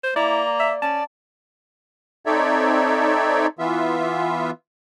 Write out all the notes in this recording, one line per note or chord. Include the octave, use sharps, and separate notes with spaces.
C5
A#3 E4 D5 A#5
E5
C#4 D5 A5
C4 D#4 A4 C#5 D5 E5
E3 B3 F4 E5